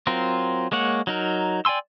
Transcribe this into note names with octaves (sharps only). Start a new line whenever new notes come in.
F#3 C4 F4 A#4
G#3 A#3 C#5 F#5
F#3 D#4 A#4
D5 G5 G#5 C6 E6